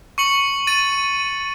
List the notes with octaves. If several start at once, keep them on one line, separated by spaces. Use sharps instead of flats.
C#6 C#7 F#7
A6 D#7